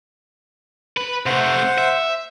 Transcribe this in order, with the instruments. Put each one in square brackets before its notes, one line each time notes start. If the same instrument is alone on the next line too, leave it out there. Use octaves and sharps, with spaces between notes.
[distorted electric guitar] B4
[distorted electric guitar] C3 A3 [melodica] C5 F#5
[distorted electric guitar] E5